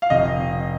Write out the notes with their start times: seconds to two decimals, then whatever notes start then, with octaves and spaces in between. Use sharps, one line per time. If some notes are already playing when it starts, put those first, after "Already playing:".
0.02 F5
0.10 F1 D#5